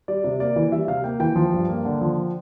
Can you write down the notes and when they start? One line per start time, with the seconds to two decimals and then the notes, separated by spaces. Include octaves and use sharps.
0.08 G3 D5
0.24 C3
0.40 A#3 D5
0.56 E3
0.72 G3 E5
0.87 C3 F5
1.04 A#3 G5
1.20 E3 G5
1.36 F3
1.53 G2
1.69 A#3
1.85 D3
2.01 F3